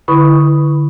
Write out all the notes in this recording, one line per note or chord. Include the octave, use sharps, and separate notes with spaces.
D3 E4 B4 B5 C#6 D#6